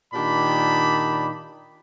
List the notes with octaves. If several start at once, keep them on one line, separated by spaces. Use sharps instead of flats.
A#2 D#3 D4 G4 D5 B5